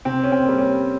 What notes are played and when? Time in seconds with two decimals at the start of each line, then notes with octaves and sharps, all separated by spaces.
0.05 C3 C4
0.24 C#4
0.32 C4
0.45 G3 A#3
0.58 C#4